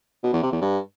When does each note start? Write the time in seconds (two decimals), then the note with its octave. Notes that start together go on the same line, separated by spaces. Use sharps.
0.23 B2
0.33 E2
0.42 C3
0.52 E2
0.61 G2